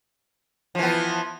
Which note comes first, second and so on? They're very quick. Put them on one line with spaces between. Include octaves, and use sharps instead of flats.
F3 E3 B3